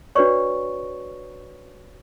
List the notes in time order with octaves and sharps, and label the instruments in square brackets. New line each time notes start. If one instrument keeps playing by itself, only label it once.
[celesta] D4 F#4 B4 C#5 D5 C#6